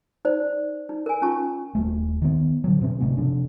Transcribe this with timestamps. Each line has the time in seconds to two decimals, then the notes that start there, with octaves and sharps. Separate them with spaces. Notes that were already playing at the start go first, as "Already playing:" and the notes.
0.25 D#4 C5 D5
0.89 D#4
1.06 A#4 G#5
1.22 C#4 F4 A5 C#6
1.75 D#1 A3
2.22 D#3 B3
2.64 D3 F#3
2.81 B2 C4 C#4
3.01 G1 C3 A3 C4
3.17 C3 F3 D4